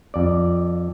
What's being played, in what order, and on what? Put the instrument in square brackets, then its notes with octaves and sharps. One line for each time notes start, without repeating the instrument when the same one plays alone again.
[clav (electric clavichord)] F2 D5